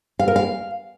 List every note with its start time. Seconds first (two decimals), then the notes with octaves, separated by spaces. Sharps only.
0.19 F5
0.28 A#4
0.36 F5